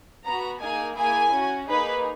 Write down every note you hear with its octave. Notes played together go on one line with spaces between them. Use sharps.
B3 F#4 A#5
A#3 D#4 G#4 G#5
A#3 E4 G#4 G#5
C#4 F#4
A#3 D#4 G#4 B4